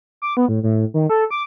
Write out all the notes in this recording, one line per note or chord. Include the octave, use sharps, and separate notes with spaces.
D6
B3
A2
A2
D#3
A4
D6